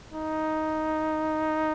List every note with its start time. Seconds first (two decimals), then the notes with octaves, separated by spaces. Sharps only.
0.12 D#4